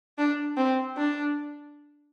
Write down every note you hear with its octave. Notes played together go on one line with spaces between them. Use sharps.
D4
C4
D4